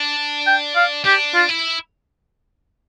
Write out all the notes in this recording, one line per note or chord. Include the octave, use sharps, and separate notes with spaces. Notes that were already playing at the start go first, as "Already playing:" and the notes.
Already playing: D4
G5
F5
D4 G4
F4
E4